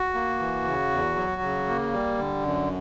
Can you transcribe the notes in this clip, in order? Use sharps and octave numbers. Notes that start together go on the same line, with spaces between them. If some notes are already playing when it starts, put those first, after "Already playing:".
Already playing: F#4
A#3
E3
C#3
E2
F#3
C#3
A#3
G3
D3
F#2